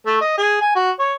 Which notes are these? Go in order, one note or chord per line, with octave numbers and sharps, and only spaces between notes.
A3
D#5
G#4
G#5
F#4
C#5